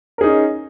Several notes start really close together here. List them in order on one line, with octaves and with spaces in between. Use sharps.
A#4 G#4 D#4 C#4